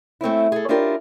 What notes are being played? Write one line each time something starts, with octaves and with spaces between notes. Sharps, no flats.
A3 C4 C#4 E4
G#4 A4
C#4 D4 E4 F4 G4 A#4